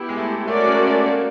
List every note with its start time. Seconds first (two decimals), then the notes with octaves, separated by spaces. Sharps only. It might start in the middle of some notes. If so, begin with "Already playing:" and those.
Already playing: B3 E4 G4
0.09 G#3
0.17 A3
0.47 A3 C#4 F#4 A#4 D5
0.66 G#3
0.87 A3
1.06 A#3